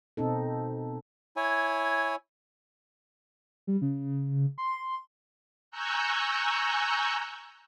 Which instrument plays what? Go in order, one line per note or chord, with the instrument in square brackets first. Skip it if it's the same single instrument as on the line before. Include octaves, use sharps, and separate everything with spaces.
[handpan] B2 C4 D#4 A4
[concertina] E4 C#5 G#5
[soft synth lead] G3
C#3
C6
[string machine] G#5 A#5 C#6 E6 F#6 G6